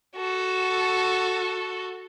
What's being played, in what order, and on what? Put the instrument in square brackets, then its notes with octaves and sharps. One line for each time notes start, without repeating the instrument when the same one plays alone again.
[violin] F#4 A4